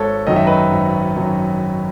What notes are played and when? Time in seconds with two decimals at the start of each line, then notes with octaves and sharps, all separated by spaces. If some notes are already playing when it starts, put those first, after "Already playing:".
Already playing: G#1 A4 C#5
0.27 F#2 D#3 F#3 D#5
0.36 E5
0.47 B4 D#5
0.71 G#1
1.16 F#2 D#3 F#3